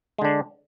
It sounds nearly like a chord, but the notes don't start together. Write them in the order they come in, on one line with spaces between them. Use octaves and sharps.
G#3 D3 D4